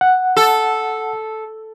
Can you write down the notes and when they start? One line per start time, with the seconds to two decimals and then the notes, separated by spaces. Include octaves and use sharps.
0.01 F#5
0.37 A4